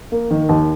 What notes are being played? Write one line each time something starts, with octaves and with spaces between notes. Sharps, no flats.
A#3
D#3
D#2